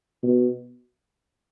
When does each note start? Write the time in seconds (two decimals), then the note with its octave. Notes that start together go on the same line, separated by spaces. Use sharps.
0.23 B2